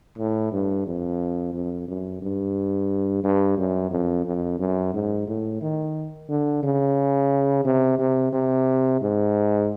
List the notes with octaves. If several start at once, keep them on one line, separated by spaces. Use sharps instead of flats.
A2
G2
F2
F2
F#2
G2
G2
F#2
F2
F2
F#2
G#2
A2
D#3
D3
C#3
C3
C3
C3
G#2